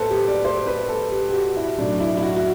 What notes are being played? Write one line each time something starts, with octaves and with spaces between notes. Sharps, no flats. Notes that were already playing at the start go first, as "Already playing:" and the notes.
Already playing: A1 F#3 B3 A4 B4 C5
G4
D5
C5
B4
A4
G4
G4
F#4
E4
B1 A2 F#3 A3 D4
E4
E4
F#4
F#4